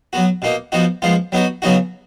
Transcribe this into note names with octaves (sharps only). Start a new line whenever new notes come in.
F#3 B3 F#4
B2 A#3 D#4
F3 B3 D#4 F#4
F3 G#3 B3 F4
F#3 B3 D#4 F#4
C#3 F#3 B3 D#4 F#4